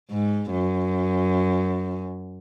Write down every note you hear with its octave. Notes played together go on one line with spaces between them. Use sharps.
G#2
F#2